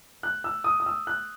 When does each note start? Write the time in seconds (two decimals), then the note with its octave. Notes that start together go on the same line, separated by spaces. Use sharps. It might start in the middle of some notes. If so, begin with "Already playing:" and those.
0.23 F#6
0.44 E6
0.64 D#6
0.80 D#6
0.86 E6
1.07 F#6